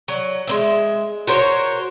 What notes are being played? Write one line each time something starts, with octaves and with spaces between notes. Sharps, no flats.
F#3
G#3 A#3 E5
F#4 A#4 C5 C#5